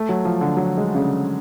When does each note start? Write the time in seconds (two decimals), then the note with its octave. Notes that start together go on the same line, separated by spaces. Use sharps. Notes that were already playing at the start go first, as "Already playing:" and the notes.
Already playing: A3
0.09 F#3
0.25 F3
0.41 D3
0.57 F#3
0.78 G#3
0.95 C#3
0.99 D3